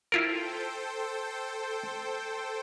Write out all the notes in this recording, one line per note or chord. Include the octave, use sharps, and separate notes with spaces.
E4 F4 A4 A#4 C5 G5